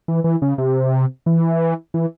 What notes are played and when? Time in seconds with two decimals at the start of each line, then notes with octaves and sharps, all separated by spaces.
0.08 E3
0.24 E3
0.42 C#3
0.58 C3
1.26 E3
1.94 E3